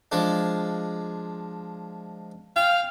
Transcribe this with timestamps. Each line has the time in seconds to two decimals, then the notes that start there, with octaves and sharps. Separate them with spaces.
0.12 F3 G#3 D4
2.56 F5 G5